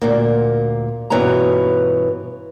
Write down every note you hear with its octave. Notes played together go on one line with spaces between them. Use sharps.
D2 A#2 A#3
G2 B2 E3 C#4 F4 A#5